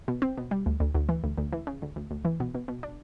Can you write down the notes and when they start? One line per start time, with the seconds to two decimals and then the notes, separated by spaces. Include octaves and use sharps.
0.08 B2
0.22 C4
0.37 B2
0.51 G3
0.66 D2
0.80 D2
0.95 D2
1.09 E3
1.24 D2
1.38 D2
1.53 E3
1.67 C#3
1.82 D2
1.96 D2
2.11 D2
2.25 E3
2.40 B2
2.55 B2
2.68 B2
2.83 D4